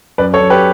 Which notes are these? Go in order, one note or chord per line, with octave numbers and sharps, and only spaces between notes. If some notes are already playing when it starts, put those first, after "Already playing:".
F#2 B4 D5
A4 C#5
F#2
G4 B4